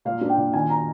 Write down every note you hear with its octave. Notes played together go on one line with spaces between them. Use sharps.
A#2 F5
D4
G5
A#2
D#3 G#5
A#5